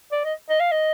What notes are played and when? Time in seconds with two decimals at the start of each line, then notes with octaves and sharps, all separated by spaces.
0.12 D5
0.25 D#5
0.50 D#5
0.60 F5
0.71 D#5